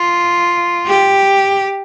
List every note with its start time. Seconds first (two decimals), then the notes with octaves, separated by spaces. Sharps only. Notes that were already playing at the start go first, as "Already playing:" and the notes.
Already playing: F4
0.87 G4